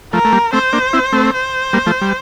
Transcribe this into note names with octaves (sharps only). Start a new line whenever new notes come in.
F3 A3 A#4
A3
G3 A#3
A3 C4 C5
A#3 D4
C4 E4
A3 C4
C5
G3 A#3
F3 A3
G3